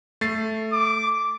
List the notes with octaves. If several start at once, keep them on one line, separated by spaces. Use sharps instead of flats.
A3 A6 C7
D6